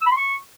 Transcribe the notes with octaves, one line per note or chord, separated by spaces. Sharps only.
E6
B5
C6
C#6